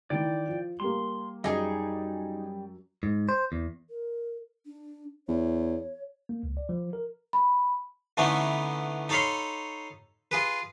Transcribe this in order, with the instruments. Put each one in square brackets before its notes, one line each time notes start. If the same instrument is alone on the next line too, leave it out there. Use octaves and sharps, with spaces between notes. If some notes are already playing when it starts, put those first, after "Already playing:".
[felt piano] D#3 E3 [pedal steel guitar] D5 G5
[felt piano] F3
[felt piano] G3 A#3 [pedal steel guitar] C6
[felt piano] F#2 [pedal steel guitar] G3 [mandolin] D#4 G#4
[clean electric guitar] G#2
C5
E2
[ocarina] A#4
D4
[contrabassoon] E2 [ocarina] C#5
[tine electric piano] A#3
C#2
D5
F3
A#4
[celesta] B5
[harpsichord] D3 E3 A3 B3 C#4 D#4
D#4 A4 C#5 F5 B5 C6
F4 G#4 B4